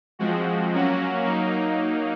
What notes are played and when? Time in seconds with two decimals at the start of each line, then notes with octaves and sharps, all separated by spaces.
0.19 F3 G#3 C4 F#4
0.72 F#3 A#3 C#4 F#4
1.25 F#3 A#3 D#4